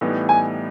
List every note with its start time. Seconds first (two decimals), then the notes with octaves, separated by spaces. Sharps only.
0.01 A2 E3 G3 B3 D#4
0.29 G#5